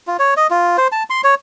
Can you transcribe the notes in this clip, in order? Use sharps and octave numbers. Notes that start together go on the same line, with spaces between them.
F4
C#5
D#5
F4
C5
A5
C6
C#5